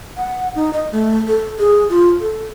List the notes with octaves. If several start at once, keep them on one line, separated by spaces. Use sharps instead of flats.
F#5
D#4
D#5
A3
A4
G#4
F4
A4